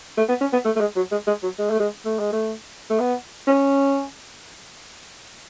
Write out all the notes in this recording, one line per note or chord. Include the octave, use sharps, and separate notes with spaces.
A3
B3
C#4
B3
A3
A3
G#3
F#3
G#3
G#3
F#3
G#3
A3
G#3
A3
G#3
A3
A3
B3
C#4